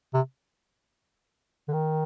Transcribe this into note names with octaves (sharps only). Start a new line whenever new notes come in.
C3
D3
D#3